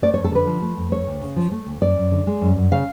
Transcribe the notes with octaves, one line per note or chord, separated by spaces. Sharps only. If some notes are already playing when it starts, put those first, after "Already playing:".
A3 D5
F2 C#5
A4
D3 B4
F3
A3
F2
A3 C#5
D2
C#3
F3
A3
D2
F#2 D5
F#2
D3
G#3
F#2
F#2
C#3 F5